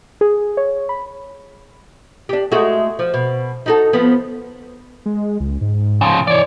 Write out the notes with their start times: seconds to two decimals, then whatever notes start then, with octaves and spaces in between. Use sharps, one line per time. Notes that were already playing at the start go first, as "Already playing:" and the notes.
0.21 G#4
0.57 C#5
0.89 B5
2.29 D4 G4
2.52 G#3 A3 F#4
2.99 F3
3.14 B2
3.66 D#4 F#4 A4
3.93 F3 B3
5.06 G#3
5.40 C#2
5.61 G#2
6.01 C#3 F3
6.27 E3 C#5 D5